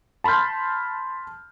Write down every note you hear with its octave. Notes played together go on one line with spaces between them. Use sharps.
A5 B5 C6 F6 G6